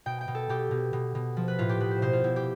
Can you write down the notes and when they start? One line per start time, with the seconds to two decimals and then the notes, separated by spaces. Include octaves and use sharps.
0.06 B2 G5
0.21 G5
0.28 B2
0.35 A4
0.49 B2 G4
0.71 B2
0.93 B2
1.15 B2
1.37 F3
1.48 B4
1.59 A2 F4
1.69 G4
1.80 B2 B4
1.91 C5
2.02 B2 C5
2.13 F4
2.24 B2 E4
2.36 G4